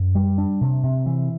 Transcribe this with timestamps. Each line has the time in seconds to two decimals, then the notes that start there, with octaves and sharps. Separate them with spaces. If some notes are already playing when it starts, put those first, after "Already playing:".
Already playing: F#2
0.15 G3
0.38 D4
0.61 C3
0.83 C3
1.06 E3